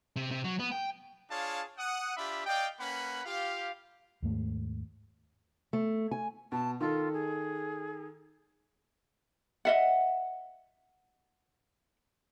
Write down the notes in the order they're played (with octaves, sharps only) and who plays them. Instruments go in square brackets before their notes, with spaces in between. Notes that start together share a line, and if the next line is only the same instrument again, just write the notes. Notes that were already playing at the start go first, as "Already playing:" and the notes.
[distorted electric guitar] C3
C3
F#3
B3
G5
[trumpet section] D4 F4 G#4 C#5 F5 A5
F#5 D#6
D4 F4 G4 E5 B5
D5 D#5 F5 G5
A#3 C#4 B4 F#5 B5
F4 G4 F5
[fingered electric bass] D#2 G#2 A3
[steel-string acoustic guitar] A3
G#5
[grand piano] B2 [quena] A5
[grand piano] D#3 A4 [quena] F4
[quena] G#4
[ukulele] D#5 E5 F#5